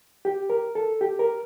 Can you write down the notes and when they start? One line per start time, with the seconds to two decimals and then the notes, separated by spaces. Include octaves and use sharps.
0.25 G4
0.50 A#4
0.75 A4
1.01 G4
1.19 A#4